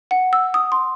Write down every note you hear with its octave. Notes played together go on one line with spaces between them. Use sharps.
F#5
E6
D#6
C6